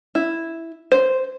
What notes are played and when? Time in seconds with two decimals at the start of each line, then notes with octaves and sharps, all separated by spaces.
0.15 E4
0.92 C5